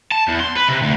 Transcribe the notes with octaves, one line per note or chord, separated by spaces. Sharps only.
A5
E2
C6
B4
C3
D2